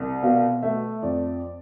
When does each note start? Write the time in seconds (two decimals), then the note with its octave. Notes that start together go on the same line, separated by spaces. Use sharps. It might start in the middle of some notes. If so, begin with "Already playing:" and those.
Already playing: C2
0.23 B2 F5
0.62 A3 E5
1.02 F2 D5